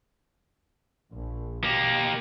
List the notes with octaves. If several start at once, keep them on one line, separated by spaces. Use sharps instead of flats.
A#1
B2 A#3 G4